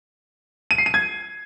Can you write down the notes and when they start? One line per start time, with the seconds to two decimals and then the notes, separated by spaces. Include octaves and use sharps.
0.71 D#7
0.78 C7
0.86 D#7
0.94 G#6